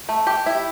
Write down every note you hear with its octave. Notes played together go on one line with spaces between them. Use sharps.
A3
G4
E4